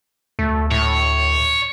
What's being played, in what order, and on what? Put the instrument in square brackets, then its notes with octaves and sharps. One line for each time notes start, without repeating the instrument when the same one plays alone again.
[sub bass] D2 [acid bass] A3
[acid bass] A2 [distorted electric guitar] C#5